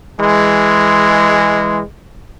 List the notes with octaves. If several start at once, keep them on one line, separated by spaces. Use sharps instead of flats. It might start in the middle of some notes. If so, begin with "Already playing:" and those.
E3 G#3